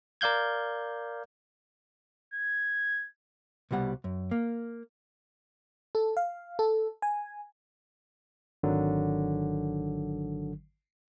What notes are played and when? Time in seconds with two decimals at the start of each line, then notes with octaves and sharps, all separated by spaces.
0.21 A#4 D5 F5 G6 G#6
2.34 G#6
3.71 C2 B2 G3 F#5
4.04 F#2
4.31 A#3
5.95 A4
6.17 F5
6.59 A4
7.02 G#5
8.63 G#1 D3 D#3 F#3